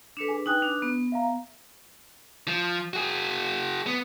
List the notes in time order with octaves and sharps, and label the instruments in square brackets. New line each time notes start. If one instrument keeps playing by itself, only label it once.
[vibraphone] D4 B4 [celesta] A4 C#7 E7
[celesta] G#4 G#5
[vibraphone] D#4 G5 G#5 [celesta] B4 D#6 F#6
[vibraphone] D4
B3
[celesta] E5 F5 A#5
[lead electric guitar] F3
F#4 G#4
B3